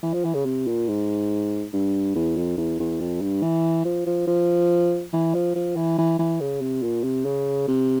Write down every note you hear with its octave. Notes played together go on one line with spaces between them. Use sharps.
E3
F3
E3
C#3
C3
A#2
G#2
G2
E2
F2
E2
E2
F2
G2
E3
F3
F3
F3
E3
F3
F3
E3
E3
E3
C#3
C3
A#2
C3
C#3
C3